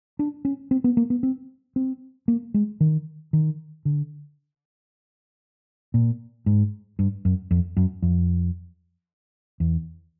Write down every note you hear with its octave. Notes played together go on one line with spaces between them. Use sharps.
D4
C#4
C4
B3
A#3
B3
C4
C4
A#3
G#3
D#3
D#3
D3
A#2
G#2
G2
F#2
F2
F#2
F2
E2